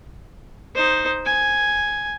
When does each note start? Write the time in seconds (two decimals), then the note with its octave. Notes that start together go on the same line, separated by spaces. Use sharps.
0.75 D#4 C5
1.25 G#5